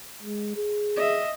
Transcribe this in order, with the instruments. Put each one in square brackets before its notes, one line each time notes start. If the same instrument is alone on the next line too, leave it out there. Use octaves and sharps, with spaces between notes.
[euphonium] G#3
G#4
[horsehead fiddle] D#5 E5